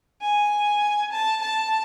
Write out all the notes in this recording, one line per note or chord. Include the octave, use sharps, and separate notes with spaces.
G#5
A5
A5